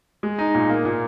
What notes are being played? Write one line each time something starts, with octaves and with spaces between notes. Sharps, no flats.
G#3
D#4
A#2
A#3
A#2